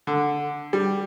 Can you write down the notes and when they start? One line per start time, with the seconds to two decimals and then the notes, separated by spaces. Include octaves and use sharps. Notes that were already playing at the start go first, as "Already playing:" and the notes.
0.07 D3
0.73 G3